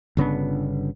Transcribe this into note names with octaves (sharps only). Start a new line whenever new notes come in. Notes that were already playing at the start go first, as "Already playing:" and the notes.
G1 C#3 B3 D4